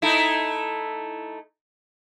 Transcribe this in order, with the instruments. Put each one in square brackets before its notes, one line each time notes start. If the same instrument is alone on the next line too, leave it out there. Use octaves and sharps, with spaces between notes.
[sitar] A3 D#4 E4